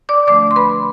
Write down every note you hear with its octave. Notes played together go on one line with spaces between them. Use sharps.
D5 D6
D3 F3 A3 D4 D5 D6
C6
B4 B5